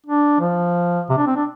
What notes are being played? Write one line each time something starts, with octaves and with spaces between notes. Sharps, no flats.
D4
F3
C3
D4
C4
D4